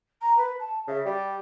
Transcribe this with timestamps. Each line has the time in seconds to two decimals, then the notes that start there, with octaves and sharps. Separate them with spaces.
0.21 A#5
0.37 B4
0.59 A5
0.87 C#3 E5
1.05 G3 D5